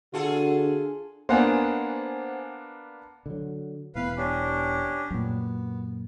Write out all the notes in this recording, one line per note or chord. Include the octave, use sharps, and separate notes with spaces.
D3 D4 F4 F#4 G#4 A4
A#3 B3 D4 C5 F#5 G#5
D3 F#3
E1 E3 B3 B4 F5
C#4 D4 G4
F#2 A#2 B3